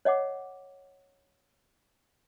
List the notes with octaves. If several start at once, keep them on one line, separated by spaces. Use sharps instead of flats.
C#5 D#5 F#5 D6